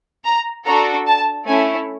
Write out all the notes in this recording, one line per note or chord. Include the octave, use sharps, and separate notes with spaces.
A#5
D4 F#4 A4 A#5
A5
A3 C#4 E4 G#5